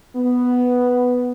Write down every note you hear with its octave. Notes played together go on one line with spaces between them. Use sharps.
B3